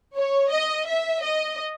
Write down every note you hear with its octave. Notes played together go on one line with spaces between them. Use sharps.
C#5
D#5
E5
D#5